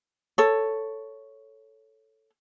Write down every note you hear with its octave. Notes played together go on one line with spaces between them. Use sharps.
A4 C#5